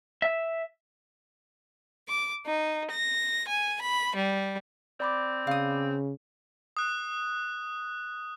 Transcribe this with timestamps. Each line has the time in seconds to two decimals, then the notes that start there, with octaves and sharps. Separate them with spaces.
0.22 E5
2.08 D6
2.46 D#4
2.89 A#6
3.48 G#5
3.81 B5
4.16 G3
5.00 C4 D5 B5 D6
5.47 C#3 F5 D#6
6.77 D#6 F#6